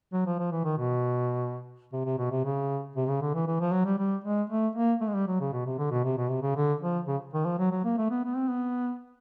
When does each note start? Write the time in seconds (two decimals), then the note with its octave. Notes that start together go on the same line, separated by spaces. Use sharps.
0.13 F#3
0.27 F3
0.39 F3
0.52 E3
0.64 D#3
0.77 B2
1.93 C3
2.05 C3
2.19 B2
2.31 C3
2.45 C#3
2.96 C3
3.08 C#3
3.22 D3
3.35 E3
3.47 E3
3.60 F3
3.72 F#3
3.86 G3
3.99 G3
4.25 G#3
4.50 A3
4.75 A#3
5.01 A3
5.08 G#3
5.15 G3
5.27 F#3
5.40 C#3
5.53 B2
5.66 C3
5.78 D3
5.91 B2
6.04 C3
6.18 B2
6.30 C3
6.42 C#3
6.56 D3
6.81 F3
7.08 C#3
7.33 D#3
7.45 F3
7.59 F#3
7.71 F#3
7.84 A#3
7.98 A3
8.11 B3
8.25 B3
8.36 C4
8.49 B3